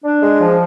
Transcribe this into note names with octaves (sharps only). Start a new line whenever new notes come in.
D4
G#3
F3